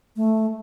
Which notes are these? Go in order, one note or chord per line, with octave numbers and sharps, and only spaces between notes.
A3